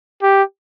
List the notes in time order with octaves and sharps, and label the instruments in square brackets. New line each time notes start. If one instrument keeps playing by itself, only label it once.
[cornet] G4